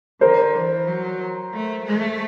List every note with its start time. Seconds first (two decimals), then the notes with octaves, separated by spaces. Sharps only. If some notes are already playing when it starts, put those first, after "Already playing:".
0.21 D3 A#4 C5
0.55 E3
0.87 F#3
1.53 A3
1.86 A3